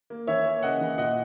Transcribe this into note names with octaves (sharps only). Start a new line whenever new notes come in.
A#3
E3 C#5 E5
A#3
C#3 D#5 F#5
E3
A#2 D#5 F#5